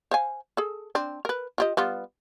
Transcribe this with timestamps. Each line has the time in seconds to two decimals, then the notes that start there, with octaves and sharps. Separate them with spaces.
0.11 C5 F5 G#5
0.57 G#4 A4
0.95 C4 D4
1.25 A#4 B4
1.58 F4 G4 D#5
1.77 G3 B3 F4